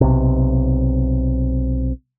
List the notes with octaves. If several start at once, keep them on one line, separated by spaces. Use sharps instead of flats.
B1 C3